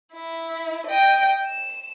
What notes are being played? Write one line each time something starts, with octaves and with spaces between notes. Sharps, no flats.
E4
D#5 G5
E7